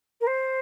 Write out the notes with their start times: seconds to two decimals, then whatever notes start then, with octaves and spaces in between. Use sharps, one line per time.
0.21 A#4
0.27 C5